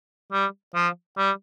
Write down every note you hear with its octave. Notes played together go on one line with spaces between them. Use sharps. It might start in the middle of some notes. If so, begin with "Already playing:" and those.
G3
F3
G3